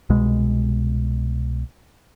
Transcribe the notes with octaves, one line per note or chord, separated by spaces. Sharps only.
C2 B2 G#3